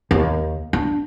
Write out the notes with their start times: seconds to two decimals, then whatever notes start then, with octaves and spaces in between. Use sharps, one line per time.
0.11 D#2
0.73 D4